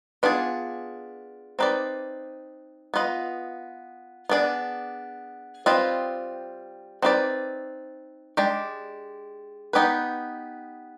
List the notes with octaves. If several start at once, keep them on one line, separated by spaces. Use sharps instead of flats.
B3 D4 F4 G#4
C4 D#4 B4 D5
B3 F4 B4 D#5
B3 D4 G#4 D5
G3 C4 F4 B4 D#5
C4 D#4 B4 D5
G#3 D4 G4 D5
B3 D#4 G4 B4